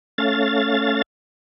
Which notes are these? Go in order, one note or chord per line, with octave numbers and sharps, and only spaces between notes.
A3 C#4 F5 A6